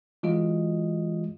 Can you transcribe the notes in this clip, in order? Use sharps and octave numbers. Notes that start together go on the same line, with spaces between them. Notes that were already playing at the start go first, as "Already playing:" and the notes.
E3 G#3 F4 F#4 D#5